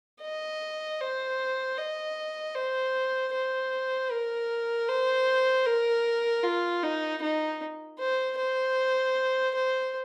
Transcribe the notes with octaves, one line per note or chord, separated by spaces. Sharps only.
D#5
C5
D#5
C5
C5
A#4
C5
A#4
F4
D#4
D#4
C5
C5
C5